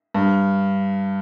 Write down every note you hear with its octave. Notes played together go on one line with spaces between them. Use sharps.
G2